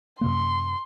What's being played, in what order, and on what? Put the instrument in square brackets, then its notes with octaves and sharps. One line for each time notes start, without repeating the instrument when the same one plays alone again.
[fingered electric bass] F#2 C3 A#3 [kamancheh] C6